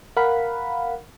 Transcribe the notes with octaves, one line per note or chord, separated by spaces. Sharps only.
A#4 F5 F#5 B5